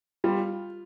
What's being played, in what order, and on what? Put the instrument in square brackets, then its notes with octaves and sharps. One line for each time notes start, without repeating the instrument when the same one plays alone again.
[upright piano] G3 [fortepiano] F4